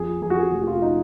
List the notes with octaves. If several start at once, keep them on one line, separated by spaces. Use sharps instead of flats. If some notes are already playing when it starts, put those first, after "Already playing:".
Already playing: F2 G#4
F2 G#4
F#4
G#4
F1 F#4
F#4
F4
D#4